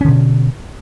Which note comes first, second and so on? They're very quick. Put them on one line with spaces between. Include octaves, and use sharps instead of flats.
C#4 D3 B2